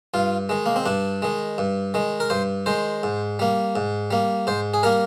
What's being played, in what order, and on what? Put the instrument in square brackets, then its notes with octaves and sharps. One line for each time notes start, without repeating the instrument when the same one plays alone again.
[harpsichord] G2 F4
D#3 G#3
A#3
C4
G2 D4
D#3 G#3
G2
D#3 G#3
A#4
G2 C5
D#3 G#3 C5
G#2
G3 A#3
G#2
G3 A#3
G#2 C5
G#4
G3 A#3 A#4